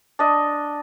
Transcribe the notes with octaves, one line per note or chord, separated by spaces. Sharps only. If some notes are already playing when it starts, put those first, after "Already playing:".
D4 D#5